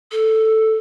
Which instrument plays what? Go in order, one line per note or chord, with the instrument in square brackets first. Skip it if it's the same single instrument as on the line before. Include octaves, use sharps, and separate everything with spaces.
[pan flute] A4